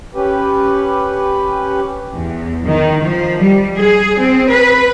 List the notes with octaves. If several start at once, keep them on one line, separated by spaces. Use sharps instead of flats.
C#4 G4 B4
E2
D#3
F3
G3
G#4
C4
B4